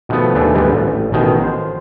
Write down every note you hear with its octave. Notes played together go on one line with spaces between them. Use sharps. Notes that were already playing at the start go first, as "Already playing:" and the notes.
B2 D#3 F3 A3 B3
D#2 E3 A3 D4
D2 G#2 E3 G3 B3
A1
A1 B2 D#3
C5